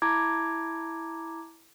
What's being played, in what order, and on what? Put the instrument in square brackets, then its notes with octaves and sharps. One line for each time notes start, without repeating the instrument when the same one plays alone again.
[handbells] E4 A5 A#5 D6 G#6